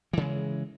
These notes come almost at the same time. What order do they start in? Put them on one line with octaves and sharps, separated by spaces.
E3 C#3 G#3